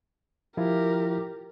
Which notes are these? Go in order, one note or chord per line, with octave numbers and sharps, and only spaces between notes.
F3 E4 F4 G4 A#4